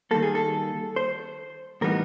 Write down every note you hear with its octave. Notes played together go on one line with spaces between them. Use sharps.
D#3 G3 A#3 A4
G#4
A4
C5
A2 E3 G3 B3 D#4 A#4